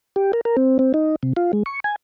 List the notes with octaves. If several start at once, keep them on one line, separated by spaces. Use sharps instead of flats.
G4
A#4
A#4
C4
C4
D#4
C3
F4
G#3
C#6
G#5